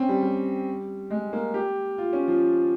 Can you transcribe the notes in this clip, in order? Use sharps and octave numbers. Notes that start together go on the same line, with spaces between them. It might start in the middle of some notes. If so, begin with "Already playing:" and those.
Already playing: C4 C#4
G3
G3
G#3
A#3
G4
F4
C#4
F3